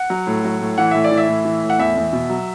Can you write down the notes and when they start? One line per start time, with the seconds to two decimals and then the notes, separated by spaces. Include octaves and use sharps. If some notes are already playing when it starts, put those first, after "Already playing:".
Already playing: F#5
0.10 F#3
0.27 A2
0.45 F#3
0.61 A2
0.78 E3 F#5
0.91 A2 E5
1.04 D5
1.11 E3
1.17 E5
1.28 A2
1.45 E3
1.63 A2
1.70 F#5
1.79 E2 E5
1.97 E2
2.13 B2
2.30 F#3